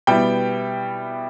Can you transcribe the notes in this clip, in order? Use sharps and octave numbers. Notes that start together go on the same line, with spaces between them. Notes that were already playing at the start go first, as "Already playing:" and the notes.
B2 G3 B3 E4 G5